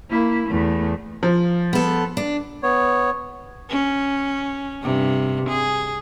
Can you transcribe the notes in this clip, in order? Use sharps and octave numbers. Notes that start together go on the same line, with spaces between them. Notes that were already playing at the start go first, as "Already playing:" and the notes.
A#3 E4
E2 A3
F3
B3 A4
D4
B3 C#5
C#4
G2 C3
G#4